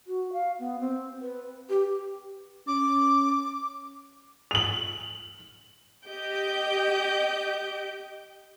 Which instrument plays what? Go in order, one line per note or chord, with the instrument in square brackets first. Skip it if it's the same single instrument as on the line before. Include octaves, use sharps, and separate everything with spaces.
[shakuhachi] F#4
F5
B3
C4
B4
G4
[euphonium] C#4 [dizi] D6
[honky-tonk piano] F7 F#7
[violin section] G4 D#5 G6 D7